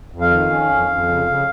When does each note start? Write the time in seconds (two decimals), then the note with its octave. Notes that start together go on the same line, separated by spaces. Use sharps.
0.12 F2
0.21 F5
0.30 D#3
0.50 C#4
0.69 F2
0.88 F2
1.08 C#3
1.26 C#3